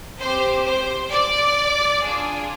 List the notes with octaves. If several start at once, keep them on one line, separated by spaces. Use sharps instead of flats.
C4 G4 C5
C5
D5
D4 F4 G#4